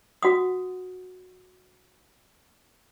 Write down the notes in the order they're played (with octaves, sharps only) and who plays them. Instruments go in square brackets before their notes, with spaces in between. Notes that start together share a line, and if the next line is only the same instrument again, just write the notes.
[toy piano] F#4 F#5 D#6